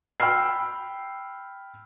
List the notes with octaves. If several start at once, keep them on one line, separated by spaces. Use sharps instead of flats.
G5 B5 E6 F6 C7